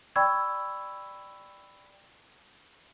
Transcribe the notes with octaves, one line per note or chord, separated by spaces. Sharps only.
D5 G5 B5 C#6 E6 G#6